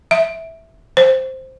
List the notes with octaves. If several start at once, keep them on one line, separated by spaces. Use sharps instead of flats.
E5
C5